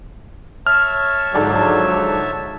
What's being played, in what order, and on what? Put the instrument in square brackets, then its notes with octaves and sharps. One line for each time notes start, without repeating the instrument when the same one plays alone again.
[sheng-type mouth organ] C#5 E5 A5 [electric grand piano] F6
[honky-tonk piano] G#2 A4 D5 [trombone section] D3 F3 F#3